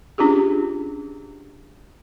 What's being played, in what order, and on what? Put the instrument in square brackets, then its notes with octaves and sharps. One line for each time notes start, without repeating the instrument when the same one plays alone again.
[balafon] C#4 D4 F4 G4 G#4